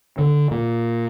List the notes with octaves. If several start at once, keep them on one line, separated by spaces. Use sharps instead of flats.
D3
A#2